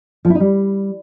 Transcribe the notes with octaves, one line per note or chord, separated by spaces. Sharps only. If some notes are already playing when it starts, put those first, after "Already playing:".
F3
E4
D#4
G3